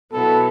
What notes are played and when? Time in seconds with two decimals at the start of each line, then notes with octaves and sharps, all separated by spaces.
0.13 B2 F#3 B3 E4 A4